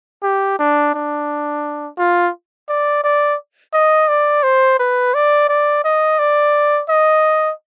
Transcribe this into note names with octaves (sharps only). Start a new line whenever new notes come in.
G4
D4
D4
F4
D5
D5
D#5
D5
C5
B4
D5
D5
D#5
D5
D#5